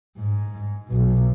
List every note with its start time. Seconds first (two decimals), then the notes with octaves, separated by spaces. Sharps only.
0.17 G#2
0.88 B1 B2